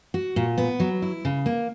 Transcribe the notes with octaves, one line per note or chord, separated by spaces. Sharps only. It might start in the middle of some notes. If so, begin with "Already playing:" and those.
F#4
A#2
B3
F#3
E4
C#3
A#3